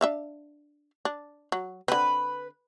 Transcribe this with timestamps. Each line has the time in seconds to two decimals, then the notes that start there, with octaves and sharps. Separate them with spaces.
0.01 D4 E5 F5
1.05 D4
1.52 F#3
1.88 D3 C4 B4